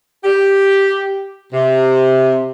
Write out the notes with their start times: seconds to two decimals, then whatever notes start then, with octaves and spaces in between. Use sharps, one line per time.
0.24 G4
1.53 C3